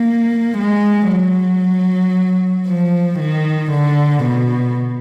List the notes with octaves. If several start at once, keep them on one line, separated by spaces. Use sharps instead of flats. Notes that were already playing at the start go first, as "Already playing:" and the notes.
Already playing: A#3
G#3
F#3
F3
D#3
D3
B2